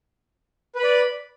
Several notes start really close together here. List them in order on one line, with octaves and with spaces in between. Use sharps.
B4 B5 D5